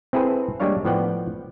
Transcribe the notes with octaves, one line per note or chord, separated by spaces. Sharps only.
C4 E4 G#4 A4 B4 C5
G3 G#3 A#3 D4 C#5 F5
A2 F3 B3 D5 F#5 G5